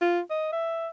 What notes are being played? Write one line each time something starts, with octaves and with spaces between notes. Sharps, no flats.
F4
D#5
E5